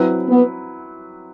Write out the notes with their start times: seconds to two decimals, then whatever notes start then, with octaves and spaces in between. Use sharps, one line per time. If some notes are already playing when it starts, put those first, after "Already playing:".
Already playing: F#3 C4 E4 B4
0.29 B3